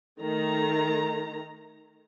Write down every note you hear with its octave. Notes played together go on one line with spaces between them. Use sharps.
D#3 A3 A#5